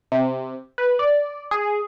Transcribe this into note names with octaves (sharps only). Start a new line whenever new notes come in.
C3
B4
D5
G#4